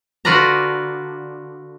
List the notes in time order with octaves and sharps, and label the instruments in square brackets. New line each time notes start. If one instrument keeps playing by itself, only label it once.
[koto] D3 F4 F#4 B4 D5 A#5